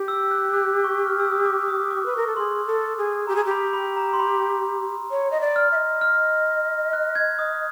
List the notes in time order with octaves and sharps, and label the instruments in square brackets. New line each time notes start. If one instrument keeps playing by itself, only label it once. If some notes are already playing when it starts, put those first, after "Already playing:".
Already playing: [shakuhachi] G4
[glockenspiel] E6
F#6
F#6
C#6
F6
E6
D#6
D6
D#6
D6
[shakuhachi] B4
[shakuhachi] A#4 [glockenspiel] C#6
[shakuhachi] A4
[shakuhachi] G#4 [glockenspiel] C6
[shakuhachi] A4
G#4
[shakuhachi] G4 [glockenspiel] A#5
[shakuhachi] G#4
G4
[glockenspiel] B5
B5
A#5
C6
B5
[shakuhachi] C#5
D#5
D5
[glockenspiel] F6
[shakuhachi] E5
D#5
[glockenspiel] F6
F#6
G#6
D#6